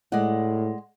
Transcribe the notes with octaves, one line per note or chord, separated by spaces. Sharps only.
A2 G#3 D5 F#5